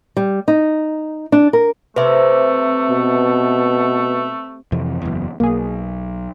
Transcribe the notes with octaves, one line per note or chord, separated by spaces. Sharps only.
G3
D#4
D4
A#4
C3 A3 B4 E5
B2
F2 C3 E3
F#1 E2
B1 A#3 G#4